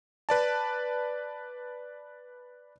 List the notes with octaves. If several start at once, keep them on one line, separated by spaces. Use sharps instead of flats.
B4 D5 A5